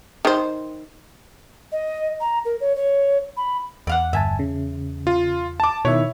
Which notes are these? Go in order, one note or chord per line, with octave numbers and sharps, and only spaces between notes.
D#3 C5
D#5
A#5
A#4
C#5
C#5
B5
E2 D5 F5 F#5
G1 E5 G#5 A5
C#3
F4
A5 D6
B2 D#3 E4 C#5 E5